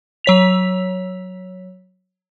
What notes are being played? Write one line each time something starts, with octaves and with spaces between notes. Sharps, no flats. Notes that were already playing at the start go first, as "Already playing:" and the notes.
F#3 C#5 B6 F7